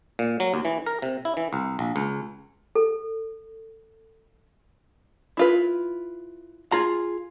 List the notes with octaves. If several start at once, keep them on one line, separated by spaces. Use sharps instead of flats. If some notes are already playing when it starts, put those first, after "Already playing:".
A#2
F#3
D#2
E3
A#4
C3
E4
E3
C2
A#1
C#2
A4
E4 F4 B4
F4 G#4 A#5